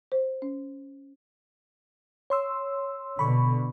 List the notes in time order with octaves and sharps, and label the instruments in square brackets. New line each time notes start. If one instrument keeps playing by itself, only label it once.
[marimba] C5
C#4
[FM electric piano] C#5 C6 E6
[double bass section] B2 D3 [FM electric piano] B5 C#6